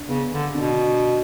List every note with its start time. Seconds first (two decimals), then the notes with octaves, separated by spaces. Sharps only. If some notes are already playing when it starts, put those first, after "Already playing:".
Already playing: D4
0.08 C#3 B3
0.32 D3
0.54 B2 D4